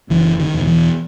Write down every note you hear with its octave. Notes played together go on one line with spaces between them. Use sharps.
F#1 E3
D#3
E2 B2
E3